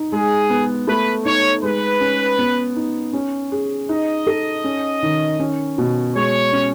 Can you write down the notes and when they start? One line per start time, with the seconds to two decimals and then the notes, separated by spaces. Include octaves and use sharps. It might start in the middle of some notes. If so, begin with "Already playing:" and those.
Already playing: D#4
0.12 G#3 G#4
0.50 B3
0.87 A3 B4
1.25 D#4 C#5
1.63 G#3 B4
2.00 C#4
2.39 B3
2.76 D#4
3.13 C#4
3.52 G#4
3.89 D#4 D#5
4.27 A4
4.64 C#4
5.03 D#3
5.40 C#4
5.78 B2
6.15 G#3 C#5
6.53 C#4